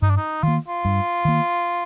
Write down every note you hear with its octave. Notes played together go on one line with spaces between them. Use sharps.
G2 D#4
D4
D#4
D#3 A#3 F4
F4
G2
D#3 A#3